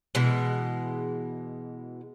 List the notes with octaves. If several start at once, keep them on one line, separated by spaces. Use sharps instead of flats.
B2 E3 G#3